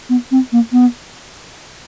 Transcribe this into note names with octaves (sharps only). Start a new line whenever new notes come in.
B3
C4
A#3
B3